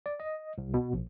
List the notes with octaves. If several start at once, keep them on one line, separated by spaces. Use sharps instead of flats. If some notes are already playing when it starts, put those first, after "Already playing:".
D5
D#5
C2
B2
A#1